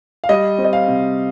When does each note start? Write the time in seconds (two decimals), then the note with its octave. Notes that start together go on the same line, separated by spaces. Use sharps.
0.24 F5
0.29 G3 D#5
0.58 C4
0.64 D#5
0.73 F5
0.88 C3